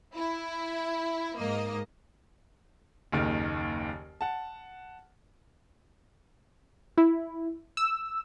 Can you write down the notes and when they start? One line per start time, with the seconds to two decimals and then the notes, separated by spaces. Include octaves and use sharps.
0.16 E4
1.37 G#2 A#3 D#5
3.12 F#1 D#2 D#3 F6
4.21 F#5 A5
6.98 E4
7.77 E6